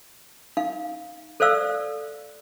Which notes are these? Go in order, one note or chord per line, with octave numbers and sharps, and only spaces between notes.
D#4 F5
A4 C5 D5 F5 E6